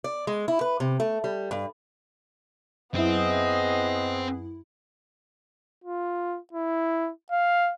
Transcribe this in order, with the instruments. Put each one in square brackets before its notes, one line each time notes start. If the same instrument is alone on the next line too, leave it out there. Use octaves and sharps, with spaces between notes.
[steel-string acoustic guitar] D5
G#3
E4
B4
C3
A3
G3
G2
[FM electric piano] F#2 E4 [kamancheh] B3 G#4 [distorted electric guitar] C4 [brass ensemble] D#5
[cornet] F4
E4
F5